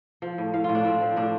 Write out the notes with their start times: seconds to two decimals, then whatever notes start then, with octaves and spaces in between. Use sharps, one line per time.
0.22 F3
0.38 A2
0.53 A2 F5
0.64 F4
0.69 A2
0.75 D4
0.84 A2 C4
1.01 F3
1.16 A2 D4